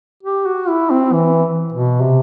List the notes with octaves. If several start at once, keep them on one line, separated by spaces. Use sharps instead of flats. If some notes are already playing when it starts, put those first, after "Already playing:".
G4
F#4
E4
C4
E3
B2
C3